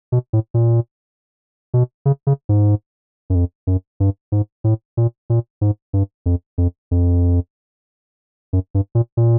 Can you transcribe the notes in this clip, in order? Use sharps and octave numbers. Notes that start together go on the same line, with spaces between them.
B2
A2
A#2
B2
C#3
C#3
G#2
F#2
F2
F#2
G2
G#2
A2
A#2
A#2
G#2
G2
F2
F2
F2
F#2
G2
A#2
A#2